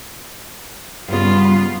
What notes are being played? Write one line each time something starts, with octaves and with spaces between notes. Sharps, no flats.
G2 C#3 B3 F4